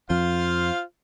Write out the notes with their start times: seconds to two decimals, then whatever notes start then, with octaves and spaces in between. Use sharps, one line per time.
0.10 F2 F3 F4 C5 F5